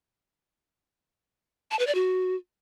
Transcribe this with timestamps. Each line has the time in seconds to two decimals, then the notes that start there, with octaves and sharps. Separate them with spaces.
1.71 A5
1.79 B4
1.87 D5
1.95 F#4